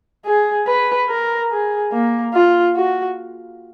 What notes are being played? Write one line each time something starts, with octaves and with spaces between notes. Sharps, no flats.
G#4
B4
A#4
G#4
A#3
F4
F#4